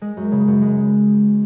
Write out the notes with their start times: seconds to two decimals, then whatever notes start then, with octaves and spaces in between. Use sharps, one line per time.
0.02 G#3
0.17 F#2
0.32 C#3
0.48 F#2
0.62 G#3